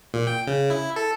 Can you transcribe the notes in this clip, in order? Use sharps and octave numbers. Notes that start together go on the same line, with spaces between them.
A#2
G5
C#3
E4
A4